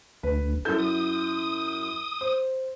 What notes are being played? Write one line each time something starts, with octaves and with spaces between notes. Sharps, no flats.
D2 B4
F#2 E4 A4 G6
D#6
C5